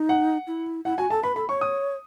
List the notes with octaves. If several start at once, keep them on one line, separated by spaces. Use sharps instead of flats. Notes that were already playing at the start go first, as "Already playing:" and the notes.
Already playing: D#4
F#5
E4
E4 F#5
F#4 G#5
A4 A5
B4 B5
A4 B5
C#5 C#6
D#6